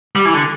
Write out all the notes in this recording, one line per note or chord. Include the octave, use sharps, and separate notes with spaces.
G3
E3
D3